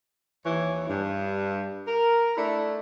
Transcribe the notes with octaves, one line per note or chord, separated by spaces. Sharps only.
D#2 E3 C#5
G2
A#4
A3 D4 E4